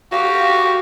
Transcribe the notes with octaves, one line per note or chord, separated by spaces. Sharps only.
F#4 G4 F5